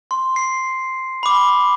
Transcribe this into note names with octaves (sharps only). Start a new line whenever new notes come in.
C6
C7
B5 D6